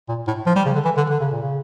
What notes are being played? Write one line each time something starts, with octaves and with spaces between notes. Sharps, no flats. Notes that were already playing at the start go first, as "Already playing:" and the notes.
A#2
A2
F3
G3
C#3
D3
E3
D3
D3
C#3
A#2
C#3